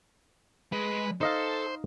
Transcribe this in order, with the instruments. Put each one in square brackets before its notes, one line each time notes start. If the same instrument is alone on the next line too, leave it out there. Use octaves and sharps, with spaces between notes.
[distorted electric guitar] G#3 [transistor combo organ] B4
[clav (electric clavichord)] D#4 D#5 F5 [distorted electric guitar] A4 [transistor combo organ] C5